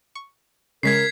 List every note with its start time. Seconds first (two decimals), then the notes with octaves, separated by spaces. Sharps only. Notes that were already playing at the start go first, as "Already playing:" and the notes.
0.15 C#6
0.83 C#3 G#3 A#4 G#6 B6 C7